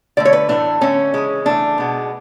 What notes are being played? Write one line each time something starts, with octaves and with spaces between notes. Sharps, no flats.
D3 A3 D5
C#5
B4
A2 E3 A3 D4
D3 A3 C#4
C#3 E3 G#3
C#3 E3 A3 D4
B2 G#3 B3